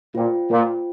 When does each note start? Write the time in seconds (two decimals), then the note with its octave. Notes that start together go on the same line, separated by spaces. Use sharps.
0.15 A#2 F4 C5 G5
0.50 A#2